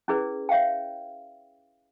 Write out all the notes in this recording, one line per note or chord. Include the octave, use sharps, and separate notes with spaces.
C#4 E4 G#4 B4 D5
C#5 E5 F5 G5